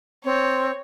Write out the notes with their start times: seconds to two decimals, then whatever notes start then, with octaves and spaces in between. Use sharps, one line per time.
0.24 C4 C#5